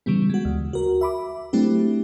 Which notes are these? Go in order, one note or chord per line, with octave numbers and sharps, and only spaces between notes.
C#3 E3 G3 B3
G#3 F#4
D2
F#4 A#4
E5 B5 D6
F#3 A3 C4 D4 E4 G4